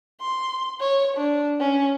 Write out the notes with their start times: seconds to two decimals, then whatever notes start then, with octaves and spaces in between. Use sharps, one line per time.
0.21 C6
0.80 C#5
1.17 D4
1.60 C#4